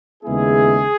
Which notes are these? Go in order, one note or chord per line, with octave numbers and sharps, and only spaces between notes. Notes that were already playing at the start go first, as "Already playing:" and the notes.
D#2 C#3 G#3 B3 E4 G#4